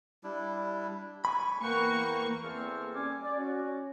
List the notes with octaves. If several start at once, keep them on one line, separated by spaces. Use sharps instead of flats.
G3 D4 E4
G#5 B5 C#6
E2 A#3 B4 F#5 G5 C#6
E2 A#3 C4 A4 F6
G3 C#4 G#5 D6
D5
C#4 F#4